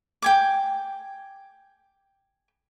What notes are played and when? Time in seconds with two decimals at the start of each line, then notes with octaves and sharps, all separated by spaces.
0.22 G5 G#5 D6